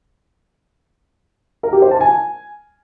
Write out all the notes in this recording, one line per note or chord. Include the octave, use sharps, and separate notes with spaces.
A#4
G4
C5
A5
G#5